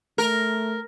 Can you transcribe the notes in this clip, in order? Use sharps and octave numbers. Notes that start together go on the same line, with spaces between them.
A3 A#4